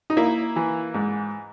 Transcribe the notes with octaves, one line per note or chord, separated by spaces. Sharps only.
D#4
A#3 E4
E3
G#2